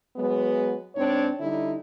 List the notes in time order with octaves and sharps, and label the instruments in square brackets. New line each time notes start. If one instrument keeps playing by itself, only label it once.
[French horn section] F#3 G#3 B3
G#2 C4 D4 C#5
D3 G3 D#4 E4